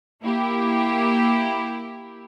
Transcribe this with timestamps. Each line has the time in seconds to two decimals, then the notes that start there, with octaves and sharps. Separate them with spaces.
0.22 A#3 E4 G4